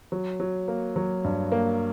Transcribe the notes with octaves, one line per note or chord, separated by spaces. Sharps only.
F#3
F#3
A#3
F#3
G2
A#3